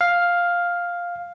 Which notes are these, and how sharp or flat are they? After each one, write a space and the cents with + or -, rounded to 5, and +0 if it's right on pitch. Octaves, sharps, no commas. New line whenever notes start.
F5 +5